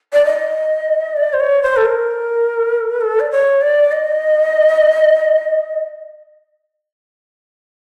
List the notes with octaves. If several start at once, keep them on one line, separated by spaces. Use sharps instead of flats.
D5
D#5
D5
C5
C#5
C5
A4
A#4
A4
D5
C#5
D5
D#5